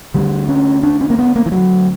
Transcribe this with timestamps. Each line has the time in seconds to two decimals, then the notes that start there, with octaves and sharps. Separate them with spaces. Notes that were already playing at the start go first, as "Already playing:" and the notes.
0.14 D2 D3 G3
0.49 C#4
0.83 D4
1.01 C#4
1.10 A#3
1.19 B3
1.36 A#3
1.46 E3
1.52 F#3